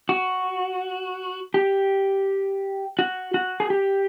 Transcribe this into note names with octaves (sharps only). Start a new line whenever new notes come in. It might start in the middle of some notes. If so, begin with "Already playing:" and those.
F#4
G4
F#4
F#4
G#4
G4